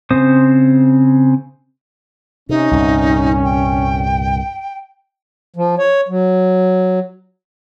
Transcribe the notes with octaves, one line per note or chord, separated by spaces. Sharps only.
C#3 C4 C5 D#6
C3 C#4 D#4
C2 G2 A#2
G5
F3
C#5
F#3